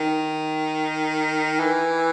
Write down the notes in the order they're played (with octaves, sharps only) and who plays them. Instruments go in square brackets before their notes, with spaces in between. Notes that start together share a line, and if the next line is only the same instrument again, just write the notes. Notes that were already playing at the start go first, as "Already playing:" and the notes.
Already playing: [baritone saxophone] D#3
E3